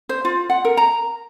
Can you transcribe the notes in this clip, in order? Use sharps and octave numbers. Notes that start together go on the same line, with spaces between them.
C5
F4
F#5
A#4
A#5